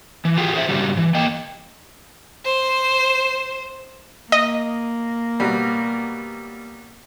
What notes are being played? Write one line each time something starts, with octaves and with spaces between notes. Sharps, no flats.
E3
F4 G4 G#4
G#4 C5 D5 E5
G2 C#3 F#3 G3
E3
A#3 D#5 G5
C5
A#3 D#5
B2 F#3 G3